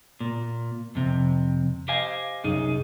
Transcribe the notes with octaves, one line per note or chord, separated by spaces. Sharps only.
A#2
F2 C3
G4 C5 D#5 F5 G#5
C2 F#2 D#4 G#4